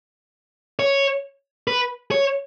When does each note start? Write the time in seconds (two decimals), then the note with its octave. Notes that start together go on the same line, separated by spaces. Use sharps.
0.79 C#5
1.67 B4
2.11 C#5